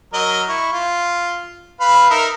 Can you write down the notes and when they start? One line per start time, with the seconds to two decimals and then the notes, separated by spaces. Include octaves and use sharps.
0.13 F#3 A#4 D#5
0.49 E4 C#6
0.73 F4
1.80 B4 F5 B5
2.10 D#4 A#4 E5